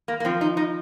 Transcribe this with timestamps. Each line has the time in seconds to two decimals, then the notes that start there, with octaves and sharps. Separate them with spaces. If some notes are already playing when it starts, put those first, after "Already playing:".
0.08 A#3
0.20 A#3
0.25 F3 C4
0.41 D#4
0.57 D#4